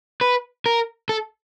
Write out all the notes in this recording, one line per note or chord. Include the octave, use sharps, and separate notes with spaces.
B4
A#4
A4